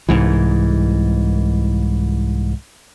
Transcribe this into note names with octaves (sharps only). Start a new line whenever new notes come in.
C2 G#2 E3